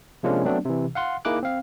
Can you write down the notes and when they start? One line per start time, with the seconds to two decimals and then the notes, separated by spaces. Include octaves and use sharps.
0.23 C3 F3 G#3 A#3 C#4 D4
0.44 F#3 A3 B3 C4 D4
0.65 C3 E3
0.95 F5 F#5 C6
1.25 A#3 D#4 E4 G#4 D6 F#6
1.43 C4 F5